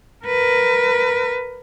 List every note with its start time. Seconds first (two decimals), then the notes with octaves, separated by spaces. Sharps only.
0.25 A#4 B4